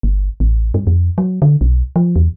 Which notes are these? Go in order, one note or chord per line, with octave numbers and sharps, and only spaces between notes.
G1
A1
G2
F2
F#3
D3
B1
F3
E2